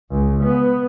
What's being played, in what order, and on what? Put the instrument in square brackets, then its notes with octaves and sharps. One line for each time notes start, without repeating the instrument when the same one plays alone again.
[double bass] C#2
B3